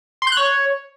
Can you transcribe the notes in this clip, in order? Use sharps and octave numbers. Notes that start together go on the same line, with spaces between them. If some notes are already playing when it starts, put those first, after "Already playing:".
C6
G6
F#6
C#5